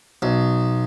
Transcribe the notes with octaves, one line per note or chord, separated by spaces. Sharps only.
B1